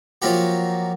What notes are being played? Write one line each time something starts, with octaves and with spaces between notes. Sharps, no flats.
F3 F#3 A#3 F#4 G4